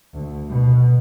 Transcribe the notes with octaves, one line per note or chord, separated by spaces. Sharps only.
D2
B2